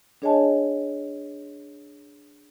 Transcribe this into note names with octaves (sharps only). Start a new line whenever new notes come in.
D4 G#4 C#5 D#5 G#5 A5